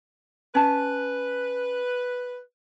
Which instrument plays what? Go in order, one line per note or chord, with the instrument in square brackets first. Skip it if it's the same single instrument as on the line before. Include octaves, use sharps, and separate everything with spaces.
[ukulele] C#4 A5 [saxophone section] B4